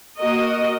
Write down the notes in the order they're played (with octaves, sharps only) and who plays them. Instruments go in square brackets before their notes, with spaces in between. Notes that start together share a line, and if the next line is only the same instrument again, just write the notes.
[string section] A#3 F#4 A#4 D#5